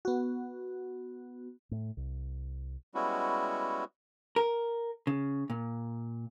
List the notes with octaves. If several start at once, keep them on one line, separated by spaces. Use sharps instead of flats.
B3 F#4
A2
C2
G3 G#3 B3 C#4 E4 F#4
A#4
C#3
A#2